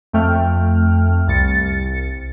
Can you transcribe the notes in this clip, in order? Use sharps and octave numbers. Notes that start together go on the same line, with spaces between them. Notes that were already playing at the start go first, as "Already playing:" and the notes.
F2 A3 G5 F6
C2 A6 C#7